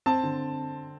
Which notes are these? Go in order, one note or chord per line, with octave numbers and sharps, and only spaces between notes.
C4 A5
D3